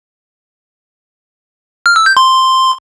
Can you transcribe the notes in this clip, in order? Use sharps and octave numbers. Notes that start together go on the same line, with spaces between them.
F6
E6
G6
C6